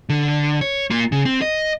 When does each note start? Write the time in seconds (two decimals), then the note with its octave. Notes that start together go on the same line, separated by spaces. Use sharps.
0.09 D3
0.61 C#5
0.91 A#3 F4
1.12 C#3
1.25 C4
1.42 D#5